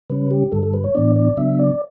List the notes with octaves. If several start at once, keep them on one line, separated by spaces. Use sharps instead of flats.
C#3 G3 C#4 B4
G4
G2 D3 G3 A4
A4
B4
C#5
A2 E3 B3 D4 D5
D5
C#3 F#3 B3 D4 E5
D5